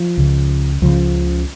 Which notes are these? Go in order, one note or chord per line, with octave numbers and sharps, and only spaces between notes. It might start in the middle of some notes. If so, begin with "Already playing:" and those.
Already playing: F3
C#2 C#3
C#2 C#3 F3